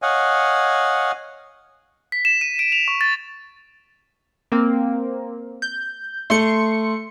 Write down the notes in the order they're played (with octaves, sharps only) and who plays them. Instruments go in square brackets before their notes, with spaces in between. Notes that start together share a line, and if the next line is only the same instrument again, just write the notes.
[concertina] C#5 D#5 F5 F#5 G#5
[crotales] B6
E7
D#7
D7
F7
C#6
A6
[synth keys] A#3 C4
G6
[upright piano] A3 [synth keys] C6 C#7